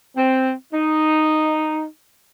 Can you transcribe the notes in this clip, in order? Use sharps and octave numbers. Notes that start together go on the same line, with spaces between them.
C4
D#4